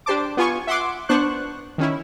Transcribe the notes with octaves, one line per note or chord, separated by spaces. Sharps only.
D4 G4 C5 A5 D6
B3 F4 G#5 C#6
E5 F#5 C6 D6
B3 D4 C5 C#6 F#6
D#3 C#4 E4